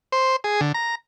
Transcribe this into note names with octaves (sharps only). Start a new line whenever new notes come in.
C5
G#4
D3
A#5